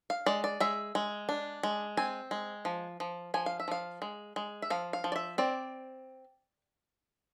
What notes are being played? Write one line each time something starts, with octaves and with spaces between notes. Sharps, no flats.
F5
G#3 D5
D5
G#3 E5
G#3
D4
G#3
C4 G#5
G#3
F3
F3
F3 G#5
F5
E5
F3 F5
G#3
G#3
E5
F3 F5
F5
F3
D5
E5
C4 D5